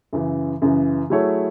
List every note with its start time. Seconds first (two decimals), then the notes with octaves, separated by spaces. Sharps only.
0.13 F#2 C#3 E3
0.62 F#2 C#3 E3
1.10 F#3 A3 E4 G#4 C#5